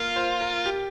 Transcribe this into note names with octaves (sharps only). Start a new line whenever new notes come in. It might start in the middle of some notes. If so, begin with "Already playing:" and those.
Already playing: A#3 F4 A#4
C5
A#4
G4